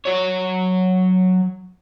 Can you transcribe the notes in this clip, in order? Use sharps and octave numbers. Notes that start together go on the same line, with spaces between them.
F#3 C#5